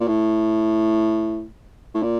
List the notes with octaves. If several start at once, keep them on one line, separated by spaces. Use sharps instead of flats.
A#2
A2
A2
A#2